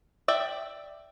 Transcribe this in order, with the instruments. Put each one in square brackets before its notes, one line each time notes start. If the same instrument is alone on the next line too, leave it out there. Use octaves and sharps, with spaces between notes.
[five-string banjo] D5 E5 G5